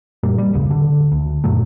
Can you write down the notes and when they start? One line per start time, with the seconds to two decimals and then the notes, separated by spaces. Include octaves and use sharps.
0.23 F#2 A#2 G3 A#3
0.38 G3
0.54 D#1 A1 C#3
0.70 D3
1.12 D2
1.44 F#2 A#2 F#3 A3